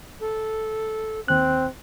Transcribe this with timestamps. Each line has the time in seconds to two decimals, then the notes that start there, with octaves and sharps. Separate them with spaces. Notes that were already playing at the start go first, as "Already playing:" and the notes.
0.21 A4
1.28 D#2 C4 F#6